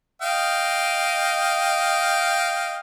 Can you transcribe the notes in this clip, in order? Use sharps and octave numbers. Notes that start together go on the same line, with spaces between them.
D#5 F5 G5